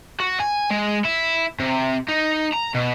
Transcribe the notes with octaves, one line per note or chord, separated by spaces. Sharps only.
F#4
G#5
G#3
E4
C3
D#4
A#5
B2